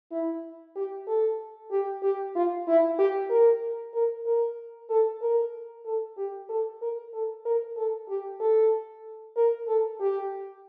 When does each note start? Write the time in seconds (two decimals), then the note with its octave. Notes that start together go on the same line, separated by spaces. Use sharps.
0.12 E4
0.76 G4
1.07 A4
1.72 G4
2.03 G4
2.35 F4
2.68 E4
2.99 G4
3.30 A#4
3.95 A#4
4.26 A#4
4.90 A4
5.22 A#4
5.86 A4
6.17 G4
6.49 A4
6.82 A#4
7.13 A4
7.45 A#4
7.77 A4
8.09 G4
8.40 A4
9.37 A#4
9.68 A4
10.00 G4